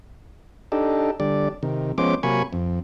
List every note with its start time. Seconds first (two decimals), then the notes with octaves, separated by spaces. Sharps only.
0.72 D4 D#4 G4 A4
1.20 D3 G3 D5
1.63 C3 D#3
1.98 F3 G#3 B3 C#4 C5 D6
2.23 C3 F#3 A#3 G#5 B5 C#6
2.53 F2